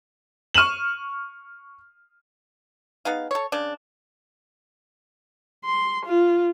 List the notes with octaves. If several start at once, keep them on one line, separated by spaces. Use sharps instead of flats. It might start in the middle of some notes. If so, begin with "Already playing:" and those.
C#6 F6 D#7 E7 F#7
B3 D#4 G#4 F5
A4 C#5
C#3 D4
C6
F4